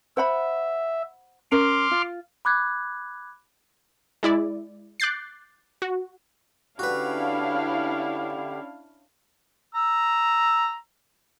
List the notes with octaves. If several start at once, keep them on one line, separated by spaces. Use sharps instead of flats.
C5 E5 F#5 B5
C#4 A#4 C6 D6 F6
F4
B5 D6 F#6 G#6
G#3 E4 D5
D6 F#6 G6 A6 C7
F#4
D3 C#4 D4 E4 F#4 G4 B4 F5
A#5 E6